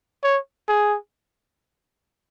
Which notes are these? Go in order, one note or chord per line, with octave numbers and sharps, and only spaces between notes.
C#5
G#4